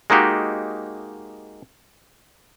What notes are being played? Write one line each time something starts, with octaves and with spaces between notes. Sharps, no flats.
G#3 A#3 D#4 F#4 G4